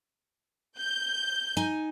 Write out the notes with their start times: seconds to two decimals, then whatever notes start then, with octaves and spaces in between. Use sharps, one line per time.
0.79 G6
1.57 D#4 G#5